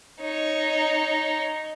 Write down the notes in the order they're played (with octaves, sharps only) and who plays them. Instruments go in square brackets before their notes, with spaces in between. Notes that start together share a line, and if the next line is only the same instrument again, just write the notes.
[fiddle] D#4 C#5